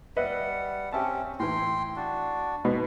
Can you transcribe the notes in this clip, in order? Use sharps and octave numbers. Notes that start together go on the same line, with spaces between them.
G3 B4 D#5 E5 F#5
C4 C#4 G4 E5 A5
A2 E3 G5 C6
D4 F#4
G#2 B2 B3